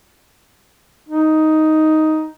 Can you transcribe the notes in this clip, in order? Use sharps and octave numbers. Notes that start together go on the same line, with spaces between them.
D#4